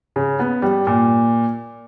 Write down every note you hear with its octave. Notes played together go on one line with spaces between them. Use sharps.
C#3
B3
G3
A#2